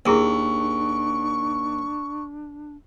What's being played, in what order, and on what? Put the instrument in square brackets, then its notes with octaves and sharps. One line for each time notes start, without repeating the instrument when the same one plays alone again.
[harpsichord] D#2 [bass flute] D4 [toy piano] E4 G#4 A#4 [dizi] C#6